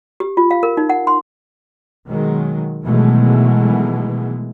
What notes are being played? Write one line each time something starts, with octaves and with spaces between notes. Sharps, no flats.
G4
F4
F5
A#4
D#4
F#5
C6
B2 D#3 F#3 G#3
B2 D#3 E3 F#3 G#3 A3